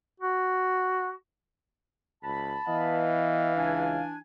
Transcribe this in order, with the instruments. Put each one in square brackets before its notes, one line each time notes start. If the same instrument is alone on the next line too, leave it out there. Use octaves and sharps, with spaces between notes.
[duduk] F#4
[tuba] C#2 [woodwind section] A5 B5
[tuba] E3 [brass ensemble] B3 D#5 [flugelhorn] F5
[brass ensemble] C#2 [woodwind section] D4 G#5